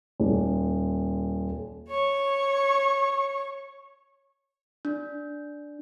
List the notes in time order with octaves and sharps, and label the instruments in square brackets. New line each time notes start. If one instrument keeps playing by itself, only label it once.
[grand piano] D#1
[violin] C#5 C#6
[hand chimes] D4